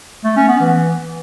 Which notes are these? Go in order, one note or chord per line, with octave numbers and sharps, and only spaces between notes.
A3
C#4
B3
E3